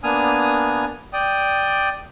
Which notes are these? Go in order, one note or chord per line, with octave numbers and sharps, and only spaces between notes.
A#3 B3 D4 G#5 D#6 F6
D5 G5 D#6